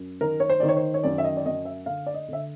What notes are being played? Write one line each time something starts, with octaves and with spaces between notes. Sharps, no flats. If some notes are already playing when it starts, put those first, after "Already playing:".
Already playing: F#2
D#3 A#4
C#5
C5
D#3 D5
C#5
C5
C#5
F#2 D5
E5
D#5
D5
F#2 D#5
E5
D3 F5
D5
D#5
D3 E5